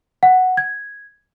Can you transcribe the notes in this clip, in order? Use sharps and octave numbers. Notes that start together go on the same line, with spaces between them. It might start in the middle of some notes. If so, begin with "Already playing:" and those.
F#5
G#6